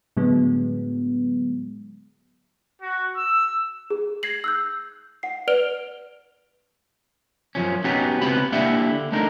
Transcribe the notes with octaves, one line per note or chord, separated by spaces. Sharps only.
A2 D3 F#3 G#3 B3
F#4
E6
G#4
G#6 A#6 C7 F#7
E6 F#6 G6
F#5 C7
B4 D5 F6 D7 F7 G7
F#2 F3 C#4
B3 C#4 D#4 F#4 G4
C#2 C3 B3 B4 B5
A#3 D4 E4 G4 E5 F#5
D3
A3 D4 D#4 A#4